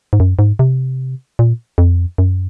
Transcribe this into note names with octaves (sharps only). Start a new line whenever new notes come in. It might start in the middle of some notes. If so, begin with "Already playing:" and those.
G#2
F#2
G#2
C3
A#2
F2
F#2